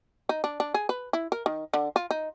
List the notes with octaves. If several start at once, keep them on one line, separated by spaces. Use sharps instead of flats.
D#4
D4
D4
G#4
B4
E4
A#4
D#3
D3
F4
D#4